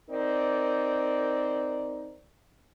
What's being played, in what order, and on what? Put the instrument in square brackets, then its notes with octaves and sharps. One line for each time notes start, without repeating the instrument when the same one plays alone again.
[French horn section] C4 D#4 A#4 D5